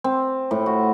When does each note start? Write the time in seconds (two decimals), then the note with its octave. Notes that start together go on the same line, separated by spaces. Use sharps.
0.04 C4
0.51 A2
0.66 F#4